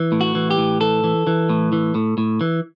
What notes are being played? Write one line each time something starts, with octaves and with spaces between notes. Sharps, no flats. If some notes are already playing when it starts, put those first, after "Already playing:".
Already playing: E3
A2
F#4
E3
G4
A2
E3 A4
E3
E3
A2
E3
A2
A2
E3